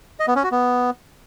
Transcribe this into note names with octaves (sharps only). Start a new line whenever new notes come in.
D#5
B3
C#4
F#4
B3